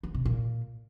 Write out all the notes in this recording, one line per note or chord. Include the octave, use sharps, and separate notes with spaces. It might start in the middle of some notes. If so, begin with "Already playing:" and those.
E2
C3
A#2